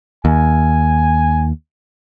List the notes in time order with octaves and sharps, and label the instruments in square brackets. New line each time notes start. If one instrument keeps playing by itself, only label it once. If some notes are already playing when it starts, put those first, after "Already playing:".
[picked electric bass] D#2 [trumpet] G#5